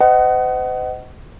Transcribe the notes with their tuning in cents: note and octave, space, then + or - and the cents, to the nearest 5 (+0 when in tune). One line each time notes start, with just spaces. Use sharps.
C5 -40 D#5 +0 F#5 +30